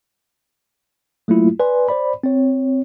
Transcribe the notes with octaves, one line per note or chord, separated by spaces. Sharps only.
F#3 A3 A#3 E4 F4
B4 D5 G#5 C6
C5 D5 B5
C4 C#5